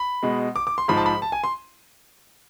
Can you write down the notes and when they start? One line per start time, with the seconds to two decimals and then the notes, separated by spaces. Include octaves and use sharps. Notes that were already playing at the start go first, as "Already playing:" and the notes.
Already playing: B5
0.23 B2 G#3
0.56 D6
0.67 D6
0.78 C6
0.88 G#2 F3 G#3 B5
0.97 A5
1.06 B5
1.22 A5
1.32 G#5
1.44 C6